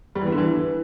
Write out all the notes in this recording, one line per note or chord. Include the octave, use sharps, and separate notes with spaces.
G3
E3
B3
D3
E3